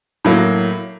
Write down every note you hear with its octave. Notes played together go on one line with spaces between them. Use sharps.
A2 F#3 A#3